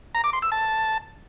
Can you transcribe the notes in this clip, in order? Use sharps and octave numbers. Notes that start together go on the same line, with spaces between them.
A#5
D6
C6
E6
A5